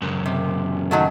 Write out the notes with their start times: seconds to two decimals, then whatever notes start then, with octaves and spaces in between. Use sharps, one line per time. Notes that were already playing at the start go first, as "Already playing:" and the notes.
0.02 C#2 F#2
0.26 C3
0.91 D#3 F#3 A3